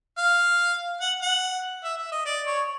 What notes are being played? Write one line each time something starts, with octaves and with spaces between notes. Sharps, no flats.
F5
F#5
F#5
E5
E5
D#5
D5
C#5